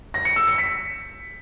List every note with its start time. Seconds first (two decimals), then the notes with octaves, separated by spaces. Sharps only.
0.14 A#6
0.25 C#7
0.36 E6
0.47 C#7
0.58 B6